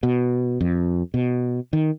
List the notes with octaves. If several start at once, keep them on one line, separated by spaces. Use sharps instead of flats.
B2
F2
B2
D#3